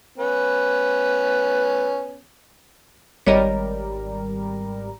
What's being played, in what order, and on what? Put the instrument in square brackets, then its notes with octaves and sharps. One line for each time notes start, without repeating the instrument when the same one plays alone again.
[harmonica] B3 C#4
[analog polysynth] G#1 G3 A#4 [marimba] C#5 D#5